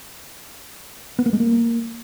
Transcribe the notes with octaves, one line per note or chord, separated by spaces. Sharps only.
B3
A#3
G#3
A#3